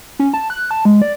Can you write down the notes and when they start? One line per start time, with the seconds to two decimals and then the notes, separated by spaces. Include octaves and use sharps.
0.19 C#4
0.34 A5
0.50 F#6
0.71 A5
0.85 G#3
1.02 D5